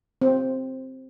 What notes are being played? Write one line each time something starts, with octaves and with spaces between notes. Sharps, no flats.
C4